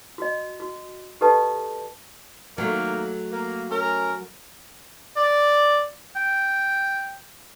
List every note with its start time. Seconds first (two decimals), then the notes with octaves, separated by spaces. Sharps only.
0.18 F#4 D#5
0.60 F#4
1.21 G4 A4 B4 D#5 A5
2.58 D#3 F#3 A3 A#3
3.32 A#3
3.71 C#4 A#4
5.17 D5
6.16 G5